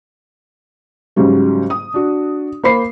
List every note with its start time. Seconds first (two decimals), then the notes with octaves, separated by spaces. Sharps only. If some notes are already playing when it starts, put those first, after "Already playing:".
1.16 G#2 C#3 F#3 G3
1.70 D#6
1.94 D4 F#4
2.64 A#3 C5 B5 C7